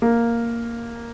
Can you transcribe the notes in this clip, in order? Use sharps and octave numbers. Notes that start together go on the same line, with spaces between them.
A#3